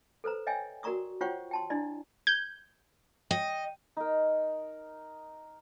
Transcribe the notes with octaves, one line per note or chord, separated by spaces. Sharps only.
A4 B4 C5 A#5
C#5 D#5 E5 G5 G#5
F#4 A#4 D5 A#5 C#6 D#6
F4 C5 C#5 F#5 G5 C#6
G5 A5 C6
D4 E4 D5 D#5
G6 G#6
D#5 G5
D#4 A#4